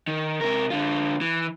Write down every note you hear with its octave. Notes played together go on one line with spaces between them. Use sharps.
D#3
C3 A#4
D3 F4
E3